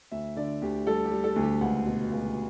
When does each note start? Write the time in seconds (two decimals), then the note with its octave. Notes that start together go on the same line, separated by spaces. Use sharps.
0.12 D2 E5
0.36 D3 D5
0.62 D2 G4
0.86 G3 A4
1.05 G4
1.12 G3
1.24 A4
1.36 D2
1.43 G4
1.61 C#2 F#5
1.86 B2
2.11 C#2